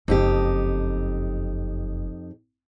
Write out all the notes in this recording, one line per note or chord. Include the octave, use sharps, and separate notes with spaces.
F#1 F2 D#4 G4